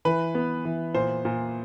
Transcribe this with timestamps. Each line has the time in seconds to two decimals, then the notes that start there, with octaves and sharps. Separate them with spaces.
0.05 E3 B4
0.35 B3
0.65 E3
0.94 A#2 C5
1.25 A#2